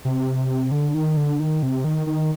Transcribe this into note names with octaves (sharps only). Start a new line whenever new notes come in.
C3
D3
D#3
D3
D#3
C3
D#3
D#3